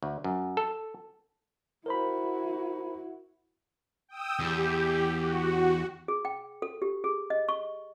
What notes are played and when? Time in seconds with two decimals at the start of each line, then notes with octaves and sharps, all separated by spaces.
0.02 D2
0.24 F#2
0.57 A4
1.86 E4 F#4 A#4 C5 B5
4.08 G5 D#6 E6
4.39 E2 G4
5.17 F#4
6.08 G#4
6.25 G5
6.62 A4
6.82 G4
7.04 G#4
7.30 D#5
7.49 C#6